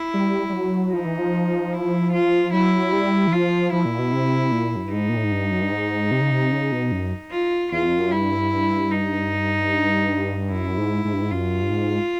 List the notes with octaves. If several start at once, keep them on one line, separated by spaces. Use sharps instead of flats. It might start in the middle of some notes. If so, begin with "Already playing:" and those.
Already playing: E4
G3
G3
F#3
F3 D#4
E3
F3
E4
F4
F#3 E4
G3
E3
F3 F4
F3 E4
A#2
B2
C3
A#2
F#2
G2
G#2 D#4
A#2
A2
G#2
G2
F#2
G2
G#2
C3
C#3
C3
C#3
B2
F#2
F4
E2 F4
F2
F#2
G2 E4
D#4
F#2 E4
G#2
G#2
G2
G#2
F#2 F4
G2
G#2